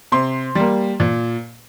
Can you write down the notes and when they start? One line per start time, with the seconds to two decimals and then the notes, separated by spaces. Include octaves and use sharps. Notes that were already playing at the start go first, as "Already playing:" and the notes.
0.12 C3 C6
0.55 G3 A#3
1.00 A#2